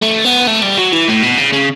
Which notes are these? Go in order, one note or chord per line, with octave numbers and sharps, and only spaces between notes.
A3
B3
A3
G3
F#3
E3
A2
B2
C#3
C#3